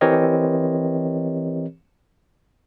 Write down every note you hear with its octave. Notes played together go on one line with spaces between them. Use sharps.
E3 C4 G4 A#4 C#5 D#5